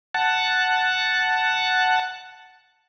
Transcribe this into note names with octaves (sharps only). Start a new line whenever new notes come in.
F#5 A5